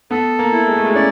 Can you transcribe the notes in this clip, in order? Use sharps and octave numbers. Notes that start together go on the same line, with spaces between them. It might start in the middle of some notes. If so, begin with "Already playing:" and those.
B3 A4
A#3
E4
G#3
A3
G#3
C#4 D5